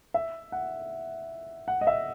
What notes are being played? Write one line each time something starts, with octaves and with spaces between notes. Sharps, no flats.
E5
F#5
F#5
D#5
E5